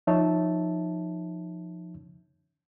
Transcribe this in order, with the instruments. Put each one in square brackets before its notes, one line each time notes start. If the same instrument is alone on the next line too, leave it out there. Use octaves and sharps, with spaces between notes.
[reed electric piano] F3 D#4 C#5 E5 A5